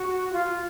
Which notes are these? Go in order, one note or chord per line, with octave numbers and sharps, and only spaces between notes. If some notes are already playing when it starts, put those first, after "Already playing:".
Already playing: F#4
F#4
F4